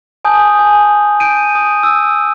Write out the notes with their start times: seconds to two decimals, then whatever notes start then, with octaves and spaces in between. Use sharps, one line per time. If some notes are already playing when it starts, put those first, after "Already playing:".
0.25 G#5 A5 D#6 G6
0.59 G#5
1.20 G6 D7 D#7
1.55 D#6
1.83 E6